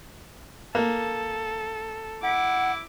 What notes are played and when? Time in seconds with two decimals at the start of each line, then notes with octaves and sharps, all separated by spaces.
0.75 A#3 A4
2.23 E4 F#5 D6